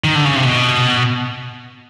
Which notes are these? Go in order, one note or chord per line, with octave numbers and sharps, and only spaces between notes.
D#3
D3
C#3
C3
B2